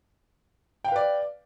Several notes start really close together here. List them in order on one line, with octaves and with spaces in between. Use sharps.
G5 F5 B4 D5